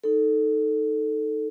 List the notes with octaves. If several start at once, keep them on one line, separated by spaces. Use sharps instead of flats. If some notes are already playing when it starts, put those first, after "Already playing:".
D#4 A4